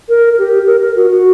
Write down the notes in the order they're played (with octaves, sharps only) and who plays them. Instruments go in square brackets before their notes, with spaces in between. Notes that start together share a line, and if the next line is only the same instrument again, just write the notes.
[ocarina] A#4
G4
A#4
A#4
F#4
F#4